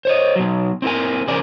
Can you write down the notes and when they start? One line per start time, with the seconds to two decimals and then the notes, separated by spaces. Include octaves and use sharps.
0.05 C5 C#5 D#5
0.36 B2 F#3
0.82 C4 E4 A#4 G#5
1.28 C#3 F3 A#4 D5 G#5